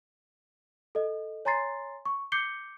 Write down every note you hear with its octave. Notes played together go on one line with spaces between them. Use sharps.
A4 D#5
C#5 G#5 A#5 C6 A6 C7
C#6
D6 G6 C7 C#7 G7